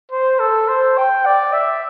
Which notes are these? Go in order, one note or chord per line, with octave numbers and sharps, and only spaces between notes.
C5
A4
C5
G5
D5
E5